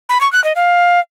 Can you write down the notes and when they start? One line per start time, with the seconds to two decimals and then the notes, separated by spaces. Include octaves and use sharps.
0.09 B5
0.21 C#6
0.32 F#6
0.44 D#5
0.56 F5